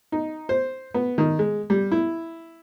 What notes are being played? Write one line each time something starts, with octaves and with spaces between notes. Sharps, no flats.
D#4
C5
B3
D#3
G#3
G3
E4